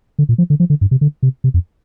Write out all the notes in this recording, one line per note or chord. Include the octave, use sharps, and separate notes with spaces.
D3
A#2
F3
D3
F3
D3
G2
C3
D3
C3
C3
F2